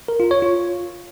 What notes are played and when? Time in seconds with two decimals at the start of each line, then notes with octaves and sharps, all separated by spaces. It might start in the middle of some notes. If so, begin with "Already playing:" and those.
0.08 A#4
0.20 F4
0.31 C#5
0.42 F4